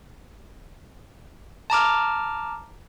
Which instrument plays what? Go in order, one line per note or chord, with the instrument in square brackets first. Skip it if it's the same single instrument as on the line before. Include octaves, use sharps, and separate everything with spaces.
[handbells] A5 A#5 D6 F6